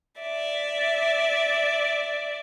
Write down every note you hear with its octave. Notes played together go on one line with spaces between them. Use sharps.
D5 E5